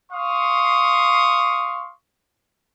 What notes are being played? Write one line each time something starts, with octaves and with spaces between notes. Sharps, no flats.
F5 C6 C#6 D#6